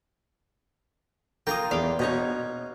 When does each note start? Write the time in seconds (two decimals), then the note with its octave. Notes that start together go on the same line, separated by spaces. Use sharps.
1.47 A#3 F4 G5 A#5 D#6
1.71 E2 F5 G5
1.99 B2 C#4 D#4 C#5